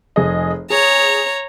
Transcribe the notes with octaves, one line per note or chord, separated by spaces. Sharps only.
F1 G#4 D#5
G#4 C#5 A#5